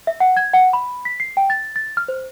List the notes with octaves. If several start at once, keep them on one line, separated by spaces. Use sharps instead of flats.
E5
F#5
G#6
F#5
B5
B6
C7
G5
A6
A6
F6
C5